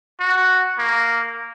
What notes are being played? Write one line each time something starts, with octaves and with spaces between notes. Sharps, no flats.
F#4
A#3